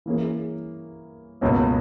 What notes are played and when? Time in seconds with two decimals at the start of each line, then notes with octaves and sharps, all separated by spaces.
0.06 E3 A#3 C#4 G#4
1.41 C#2 B2 A#3 C#4